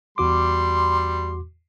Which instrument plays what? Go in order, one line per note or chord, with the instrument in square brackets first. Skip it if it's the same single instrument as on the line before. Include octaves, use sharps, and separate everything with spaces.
[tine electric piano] E2 F#4 D6 [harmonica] G3 C6